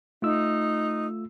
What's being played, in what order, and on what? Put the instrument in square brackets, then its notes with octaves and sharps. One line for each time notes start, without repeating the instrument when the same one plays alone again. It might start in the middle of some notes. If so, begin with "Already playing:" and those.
[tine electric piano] A3 F4 E6 [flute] D#4